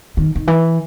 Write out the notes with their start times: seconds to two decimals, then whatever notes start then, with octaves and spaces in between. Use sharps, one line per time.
0.17 D#3
0.35 D#3
0.47 E3